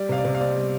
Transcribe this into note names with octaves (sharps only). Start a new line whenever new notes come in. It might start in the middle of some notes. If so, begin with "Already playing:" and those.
Already playing: G3 D5
C3 F5
D5
C3
F5
C4 D5
G3